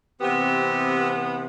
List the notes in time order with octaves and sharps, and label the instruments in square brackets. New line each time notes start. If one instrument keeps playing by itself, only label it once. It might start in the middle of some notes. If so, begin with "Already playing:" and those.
[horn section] C3 E3 B3 [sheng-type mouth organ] C4 G4